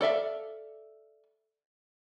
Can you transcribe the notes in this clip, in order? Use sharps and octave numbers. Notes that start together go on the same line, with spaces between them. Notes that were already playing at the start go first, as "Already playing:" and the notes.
A4 D5 E5 F5